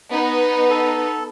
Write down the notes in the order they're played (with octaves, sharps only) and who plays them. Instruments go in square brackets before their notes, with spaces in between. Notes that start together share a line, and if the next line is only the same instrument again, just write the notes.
[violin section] B3 D#4
[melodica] A4